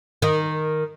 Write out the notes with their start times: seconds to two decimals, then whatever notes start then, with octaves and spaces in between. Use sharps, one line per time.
0.22 D#3